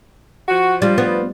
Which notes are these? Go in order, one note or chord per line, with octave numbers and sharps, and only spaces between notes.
F3 F#4
F3 G3 D4 F4
B3